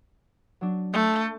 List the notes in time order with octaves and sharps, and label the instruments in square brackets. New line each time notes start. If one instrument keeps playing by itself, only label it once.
[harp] F#3 D4
[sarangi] A3 [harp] C6 G6